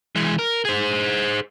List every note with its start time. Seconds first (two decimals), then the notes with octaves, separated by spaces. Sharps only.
0.16 E3 G#3
0.39 A#4
0.65 G#4 C5